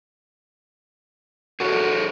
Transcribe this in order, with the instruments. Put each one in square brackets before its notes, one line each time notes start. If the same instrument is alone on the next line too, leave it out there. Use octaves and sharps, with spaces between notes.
[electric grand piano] F#4 [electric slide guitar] G#4 A4 C#5